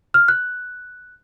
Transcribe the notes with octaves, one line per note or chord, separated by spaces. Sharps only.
F6
F#6